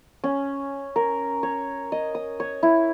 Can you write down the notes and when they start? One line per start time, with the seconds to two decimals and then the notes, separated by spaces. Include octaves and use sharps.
0.24 C#4
0.96 A#4
1.43 C#5
1.92 D#5
2.15 D#6
2.40 C#5
2.63 E4